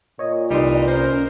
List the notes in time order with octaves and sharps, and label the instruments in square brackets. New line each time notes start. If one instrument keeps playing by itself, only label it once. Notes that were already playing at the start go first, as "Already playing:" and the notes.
[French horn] A#2 [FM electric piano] C#5 D#5
[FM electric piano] C2 C6 [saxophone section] E3 G3 D#4
[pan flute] C#4 [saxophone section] A#4 C5